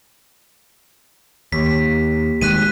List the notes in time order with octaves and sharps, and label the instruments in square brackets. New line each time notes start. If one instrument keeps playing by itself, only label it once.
[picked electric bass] D#2 [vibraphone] A#3 G4 [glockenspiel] B6
[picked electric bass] D#1 D#3 G#3 [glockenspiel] F#6 B6 D#7